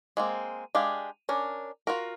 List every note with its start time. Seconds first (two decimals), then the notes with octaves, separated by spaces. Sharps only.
0.17 G#3 A#3 C4
0.75 G#3 D4 G4 F5
1.29 C#4 D4 A#4
1.87 F4 F#4 A#4